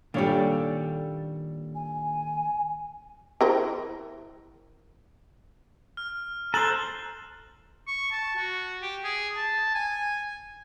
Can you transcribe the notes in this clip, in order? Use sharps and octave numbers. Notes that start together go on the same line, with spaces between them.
A#2 D#3 G3 D4 A4 C#5 F5
G#5
E3 A#4 C5
F6
A4 C5 A#5 F#6 F#7
C#6
A5
F#4
G4
G#4
A5
G#5